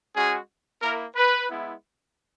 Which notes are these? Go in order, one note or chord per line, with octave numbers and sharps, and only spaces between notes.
G#3 C#4 F#4 G#4
A#3 E4 A#4
B4
G#3 B3 E4